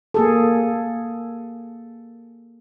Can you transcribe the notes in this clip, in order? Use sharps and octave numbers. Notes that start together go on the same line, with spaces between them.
A#3 G#4 A4